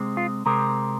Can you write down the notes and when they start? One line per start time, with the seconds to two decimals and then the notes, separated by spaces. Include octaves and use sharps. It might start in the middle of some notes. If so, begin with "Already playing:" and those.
Already playing: C3 G#3 C4
0.17 F4
0.46 C3 G#3 C4 A#4